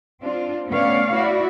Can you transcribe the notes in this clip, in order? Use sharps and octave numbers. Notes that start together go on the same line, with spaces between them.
C4 D4 F4
A3 B3 C#4 C#5 D5 F5
E4 F#4 D5